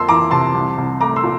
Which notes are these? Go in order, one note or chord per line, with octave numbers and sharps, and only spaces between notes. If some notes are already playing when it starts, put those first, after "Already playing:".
Already playing: F2 A#3 A5 C6 E6
E3 A#5 D6
C3 A5 C6
C2
C2
A3 A#5 D6
C6 E6
A#2